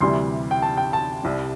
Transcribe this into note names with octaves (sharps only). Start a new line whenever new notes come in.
D2 C3 E3 G3 C6
G5
A5
G5
A5
C2 C3 G3